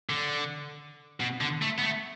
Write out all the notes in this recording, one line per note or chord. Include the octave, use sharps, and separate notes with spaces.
D3
B2
D3
A3
B3
A3